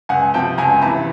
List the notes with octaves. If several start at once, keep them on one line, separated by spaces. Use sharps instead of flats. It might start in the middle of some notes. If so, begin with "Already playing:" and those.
C#2 F#5 G#5
C3 F3 G5 A5
C#2 G#5 A#5
C3 E3 A5 B5